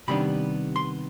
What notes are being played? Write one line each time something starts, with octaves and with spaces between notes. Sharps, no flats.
C3 D#3 G3 B3 D4 B5
C6